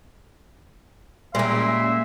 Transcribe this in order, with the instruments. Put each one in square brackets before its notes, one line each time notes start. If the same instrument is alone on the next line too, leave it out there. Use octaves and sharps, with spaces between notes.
[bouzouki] A#2 A#3 [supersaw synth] G3 G#3 C#4 [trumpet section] E5 [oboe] C6